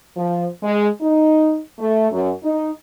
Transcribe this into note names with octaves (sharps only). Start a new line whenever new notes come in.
F3
G#3
D#4
A3
F#2
D#4